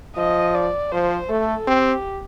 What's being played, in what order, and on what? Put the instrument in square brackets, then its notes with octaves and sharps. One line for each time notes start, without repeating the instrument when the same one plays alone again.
[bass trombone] F3 [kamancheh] D#5
[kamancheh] D5
[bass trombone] F3 [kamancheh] C5
[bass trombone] A3 [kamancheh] A4
[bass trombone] C4 [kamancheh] G4